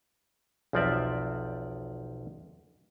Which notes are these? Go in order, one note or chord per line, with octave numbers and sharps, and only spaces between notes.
B1 E2 F3 C4 D5 E5